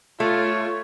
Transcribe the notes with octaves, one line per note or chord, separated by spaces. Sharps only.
A3 F4 C#5